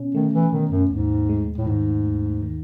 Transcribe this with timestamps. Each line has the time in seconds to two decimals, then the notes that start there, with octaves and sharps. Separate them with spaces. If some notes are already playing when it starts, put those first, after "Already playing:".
Already playing: B2 C#4
0.14 D#3 A3
0.33 E3
0.52 B2 D#3
0.71 F#2
0.90 D#2 G#2
1.29 G#3
1.58 A2
1.66 G#2 D#3
2.04 D#2
2.42 D#3